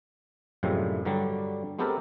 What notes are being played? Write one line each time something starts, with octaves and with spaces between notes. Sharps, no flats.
F#2 A2 C3 F3 G3 G#3
G2 D3 F#3 G3
G#3 B3 C4 G4 A4 A#4